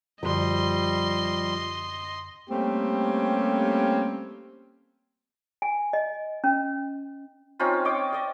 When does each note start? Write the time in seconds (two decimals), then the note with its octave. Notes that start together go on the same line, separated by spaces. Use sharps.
0.23 F#2 D3 F3 G3 D#5 C6
2.50 G3 A3 A#3 C4 C#4 G4
5.62 G#5
5.93 D#5
6.44 C#4
7.59 C4 C#4 D#4 F4
7.85 C#5 D#5 G5 D6
8.13 D5 D#5